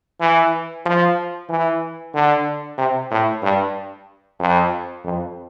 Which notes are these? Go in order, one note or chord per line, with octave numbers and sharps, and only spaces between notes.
E3
F3
E3
D3
C3
A2
G2
F2
F2